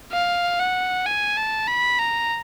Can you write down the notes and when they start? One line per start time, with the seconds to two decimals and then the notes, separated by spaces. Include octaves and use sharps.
0.13 F5
0.60 F#5
1.06 G#5
1.37 A5
1.68 B5
1.99 A#5